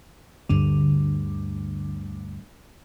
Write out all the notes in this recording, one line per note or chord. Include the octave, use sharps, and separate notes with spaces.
D2 G2 D3